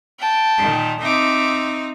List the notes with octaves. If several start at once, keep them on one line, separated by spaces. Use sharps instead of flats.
G5 A5
A#2 D#3
C4 D#4 E5 D6